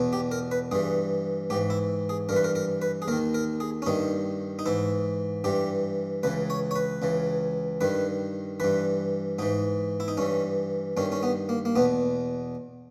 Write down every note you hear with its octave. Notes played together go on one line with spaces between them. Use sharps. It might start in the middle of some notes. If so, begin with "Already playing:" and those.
Already playing: E2 B2
G4
A#4
B4
G2 E3 G#4
G#2 E3 G4
E4
G#4
G2 E3 A#4 B4
A#4
A#4
B4
G#4
D#2 D#3 A#4
A#4
G#4
C#4
G2 D#3 D#4
D#4
G#2 E3 E4
G2 E3 G4
C#2 C#3 E3 B4
C#5
C#5
B4
C#2 C#3 E3
G2 D#3 B4
G2 E3 B4
G#2 E3 D#4
E4
D#4
G2 E3 C#4
G2 D#3 C#4
C#4
B3
A#3
A#3
E2 B2 B3